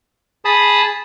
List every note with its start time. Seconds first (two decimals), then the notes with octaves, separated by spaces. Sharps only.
0.45 G#4 A5 B5 D#6